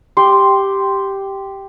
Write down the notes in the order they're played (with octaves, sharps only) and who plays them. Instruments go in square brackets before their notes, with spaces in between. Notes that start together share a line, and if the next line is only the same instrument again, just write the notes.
[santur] G4 G5 C6